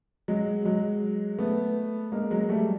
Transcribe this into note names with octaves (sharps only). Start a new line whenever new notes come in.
F#3 G#3
F#3 G#3
A3 B3
G#3 A#3
F#3 G#3
G3 A3